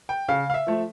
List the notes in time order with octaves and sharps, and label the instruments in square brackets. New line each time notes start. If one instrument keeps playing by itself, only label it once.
[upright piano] G5
C#3 F5
F5
E5
F3 A3